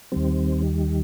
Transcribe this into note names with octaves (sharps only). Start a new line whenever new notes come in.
D#2 D#3 G3 C4